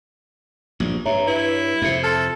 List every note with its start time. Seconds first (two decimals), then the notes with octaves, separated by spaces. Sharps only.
0.80 A#1 G2
1.06 G2 C#5 E5 A#5
1.27 E4 B4
1.49 C#5
1.82 F2 C3 E5 C#7
2.03 A4 C6 F6